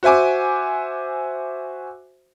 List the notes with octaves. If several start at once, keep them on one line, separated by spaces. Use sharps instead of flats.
F#4 C5 E5 G#5 D6